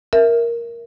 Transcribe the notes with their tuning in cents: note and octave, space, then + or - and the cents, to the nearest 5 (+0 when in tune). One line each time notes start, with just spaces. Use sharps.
A#4 +5 E5 +0